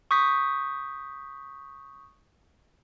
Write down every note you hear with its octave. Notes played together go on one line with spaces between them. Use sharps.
C#6 D#6 G6 B6